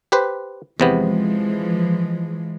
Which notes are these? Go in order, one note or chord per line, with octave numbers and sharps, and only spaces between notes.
G4 B4 C5
E2 C3 E3 F3 G#3 B3